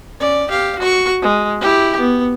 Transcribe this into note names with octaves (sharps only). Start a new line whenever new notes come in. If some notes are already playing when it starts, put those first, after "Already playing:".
C#4 D5
G4 F5
F#4 C#6
G#3
E4 G4
B3